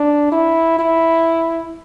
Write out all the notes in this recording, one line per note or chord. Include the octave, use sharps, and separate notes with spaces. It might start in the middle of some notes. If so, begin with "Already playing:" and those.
Already playing: D4
E4
E4